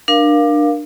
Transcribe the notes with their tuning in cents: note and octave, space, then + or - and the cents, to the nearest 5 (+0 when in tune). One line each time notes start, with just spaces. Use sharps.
D4 +20 A#4 +20 F5 +0